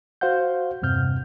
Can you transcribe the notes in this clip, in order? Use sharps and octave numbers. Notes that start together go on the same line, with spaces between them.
F#4 C5 F5 F#5 G6
E2 G2 C3 F6 G6